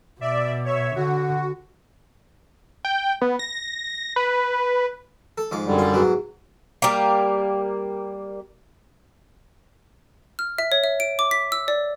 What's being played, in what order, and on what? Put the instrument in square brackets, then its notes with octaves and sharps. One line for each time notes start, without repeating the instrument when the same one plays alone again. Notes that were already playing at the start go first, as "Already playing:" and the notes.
[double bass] B2 [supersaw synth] D5 E5
[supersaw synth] C#5 E5
[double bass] D3 [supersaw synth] F#4
[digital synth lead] G5
B3
A#6
B4
[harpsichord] A4
G#2 F3 D6
[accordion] F#2 D3 G3
[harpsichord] F4
G#2 B2 F#3
[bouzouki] G3 A#3
[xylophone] F6
E5
C#5
E5
D7
D6
B6
E6
D5